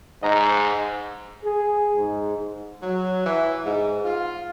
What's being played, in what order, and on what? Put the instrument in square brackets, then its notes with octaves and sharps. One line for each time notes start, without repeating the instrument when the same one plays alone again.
[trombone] G#2 [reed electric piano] D#5 A#5
[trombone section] G#4
G#2
[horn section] F#3
E3
G#2
F4